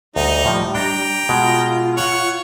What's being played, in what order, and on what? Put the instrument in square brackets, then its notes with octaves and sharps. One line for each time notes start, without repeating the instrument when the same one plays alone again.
[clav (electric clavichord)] D2 [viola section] G3 [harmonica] D#4
[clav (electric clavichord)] A2 F3
[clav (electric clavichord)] D4 [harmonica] G5 A#5
[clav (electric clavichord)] B2 G#3 [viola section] F4
[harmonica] C#5 F#5